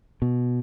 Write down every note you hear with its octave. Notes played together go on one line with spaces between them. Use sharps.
B2